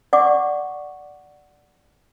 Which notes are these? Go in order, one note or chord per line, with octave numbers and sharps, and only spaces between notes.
D5 F#5 C#6 D6